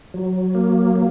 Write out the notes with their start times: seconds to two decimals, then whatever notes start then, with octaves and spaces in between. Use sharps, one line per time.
0.14 F#3
0.55 A#3
0.95 A#3